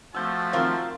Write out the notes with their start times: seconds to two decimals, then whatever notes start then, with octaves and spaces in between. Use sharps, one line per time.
0.15 F3 A3 F#4 A5 E6 G6
0.53 D#3 C4 F4 A#4 C6